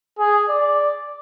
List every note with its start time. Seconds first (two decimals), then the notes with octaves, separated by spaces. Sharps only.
0.19 G#4
0.49 D5